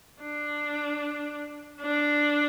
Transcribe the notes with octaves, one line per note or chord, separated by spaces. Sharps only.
D4
D4